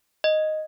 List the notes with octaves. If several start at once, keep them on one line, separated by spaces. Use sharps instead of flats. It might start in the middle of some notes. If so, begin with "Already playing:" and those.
D#5